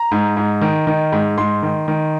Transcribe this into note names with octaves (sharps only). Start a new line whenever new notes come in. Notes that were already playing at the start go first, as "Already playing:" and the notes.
Already playing: A#5
G#2
G#2
D#3
D#3
G#2
G#2 C6
D#3
D#3